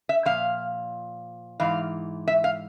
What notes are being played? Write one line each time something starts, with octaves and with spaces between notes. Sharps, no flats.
E5
A#2 F3 F5
G#2 E3 F5
E5
F5